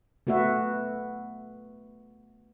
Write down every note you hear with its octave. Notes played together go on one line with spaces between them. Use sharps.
A3 B3 F#4 B4 E5